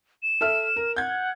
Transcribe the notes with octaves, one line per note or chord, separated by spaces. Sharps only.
E7
A4 E5 F6
A#4
F#5 G6 G#6